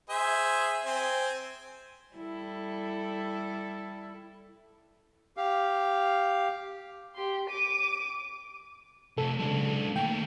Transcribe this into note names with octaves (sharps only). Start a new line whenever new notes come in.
G#4 C5 E5
C4 G#5
G3 E4 A4
G4 F5
G4 C6
D6 D#7
C3 A3 A4
C#3 F#3 G#3 D4
D#3 A3 A#3 G5